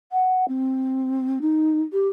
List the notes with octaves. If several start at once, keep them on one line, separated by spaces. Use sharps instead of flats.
F#5
C4
D#4
G4